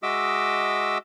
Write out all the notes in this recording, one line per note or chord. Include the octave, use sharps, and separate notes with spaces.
G#3 F#4 D#5 E5 D6 E6